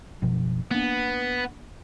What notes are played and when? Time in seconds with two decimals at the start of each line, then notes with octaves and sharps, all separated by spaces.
0.22 F#1 B2 F3
0.71 A#3 B3 D4